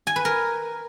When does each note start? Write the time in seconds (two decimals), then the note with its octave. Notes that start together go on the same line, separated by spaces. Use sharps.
0.07 G#5
0.16 B4
0.25 A#4